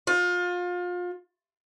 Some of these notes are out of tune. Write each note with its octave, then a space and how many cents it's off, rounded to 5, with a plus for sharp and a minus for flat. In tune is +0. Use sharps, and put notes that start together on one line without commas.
F4 +30